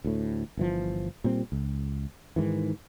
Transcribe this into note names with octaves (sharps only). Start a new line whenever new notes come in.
D2 A2
G1 E3 F3
A#2 G3 C4
C#2
G#2 D#3 E3